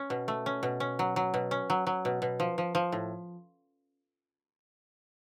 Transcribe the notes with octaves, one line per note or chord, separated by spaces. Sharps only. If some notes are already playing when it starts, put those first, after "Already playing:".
Already playing: C#4
B2
A3
C#4
B2
C#4
F#3
F#3
B2
C#4
F#3
F#3
B2
B2
F3
F3
F3
A2